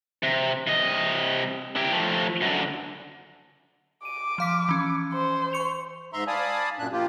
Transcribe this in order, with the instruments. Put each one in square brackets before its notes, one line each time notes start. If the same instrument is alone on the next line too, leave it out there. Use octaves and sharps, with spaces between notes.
[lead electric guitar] C3
C3 D#5
E4 G4
F3 A3
F#2 D3
[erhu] D6 [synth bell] D#7
[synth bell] F3 F5 B6
E3 C#4
[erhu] C5
[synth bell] C#6 C#7 F7
[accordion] G#2 E5 A#5 C6
D5 F5 G#5 A5 B5 D#6
F#2 A#2 D4 F#6
F3 A#3 F4 G4